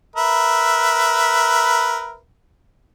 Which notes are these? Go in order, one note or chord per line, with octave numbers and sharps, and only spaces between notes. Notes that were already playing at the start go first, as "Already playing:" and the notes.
A#4 B4 E5